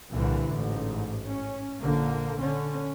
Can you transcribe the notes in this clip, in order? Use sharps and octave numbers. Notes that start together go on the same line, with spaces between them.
C2 A#2 D3 E3
A1 G#2
C#4
A#1 D3 A#3
D3 C#4